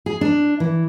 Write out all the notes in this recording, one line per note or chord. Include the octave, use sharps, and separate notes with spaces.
G#4
D4
E3